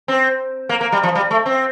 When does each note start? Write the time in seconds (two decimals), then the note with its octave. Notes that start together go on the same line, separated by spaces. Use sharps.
0.08 C4
0.69 A#3
0.81 A#3
0.92 G3
1.03 F3
1.15 G3
1.31 A3
1.46 C4